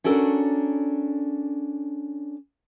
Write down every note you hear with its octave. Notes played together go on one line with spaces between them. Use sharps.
C#4 D4 F#4 A4 A#4